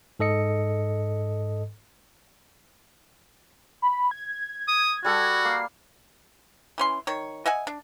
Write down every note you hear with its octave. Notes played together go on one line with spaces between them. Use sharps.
G#2 A4 D#5 C#7
B5
G#6
D#6
G3 F#4 A4
A#3 C7
E3 C#4 C6
D#3 C#5
D#5 E5 F#5 G#5
D4